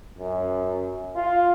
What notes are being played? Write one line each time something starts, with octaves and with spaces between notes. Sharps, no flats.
F#2
F4